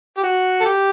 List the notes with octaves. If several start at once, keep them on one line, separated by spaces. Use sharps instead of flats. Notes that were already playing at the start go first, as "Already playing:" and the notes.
G4
F#4
A4
G4